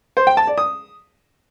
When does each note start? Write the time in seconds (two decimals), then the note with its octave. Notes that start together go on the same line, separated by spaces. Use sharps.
0.17 C5
0.27 G5
0.37 A5
0.47 D5
0.58 D#6